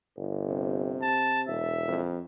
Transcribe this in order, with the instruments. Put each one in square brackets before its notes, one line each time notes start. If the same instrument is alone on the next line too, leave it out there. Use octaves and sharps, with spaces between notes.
[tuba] G1
[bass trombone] C3
[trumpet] A5
[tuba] E1 [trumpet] E5
[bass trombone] F2